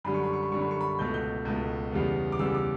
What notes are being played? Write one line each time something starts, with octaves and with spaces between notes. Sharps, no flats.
F#2 D3 G3 B5
C#6
B5
C#6
B5
F#2 D3 G3 C#6
B5
C#6
B5
C#2 B2 A3 G6
G6
C#2 B2 A3
E2 C#3 G3 B3
D6
E2 C#3 G3 B3 E6
D6